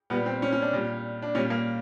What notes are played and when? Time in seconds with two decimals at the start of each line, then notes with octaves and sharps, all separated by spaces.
0.10 A#2 G3 B3
0.26 C4
0.42 C#4
0.52 C#4
0.62 D4
0.73 A#2 G3
1.22 D4
1.35 A#2 G3 C#4
1.50 A#3